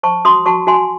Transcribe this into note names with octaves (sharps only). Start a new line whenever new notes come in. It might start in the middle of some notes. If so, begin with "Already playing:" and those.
C5 A5 C#6
F#4 C6 D#6
F#4 A5 C#6
F#4 G#5 C6